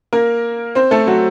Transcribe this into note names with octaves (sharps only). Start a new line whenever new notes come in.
A#3 A#4
C4 C5
A3 A4
F#3 F#4